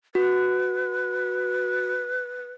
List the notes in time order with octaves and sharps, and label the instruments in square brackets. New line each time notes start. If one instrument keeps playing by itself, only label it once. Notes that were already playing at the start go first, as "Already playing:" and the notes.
[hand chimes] F#4 [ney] B4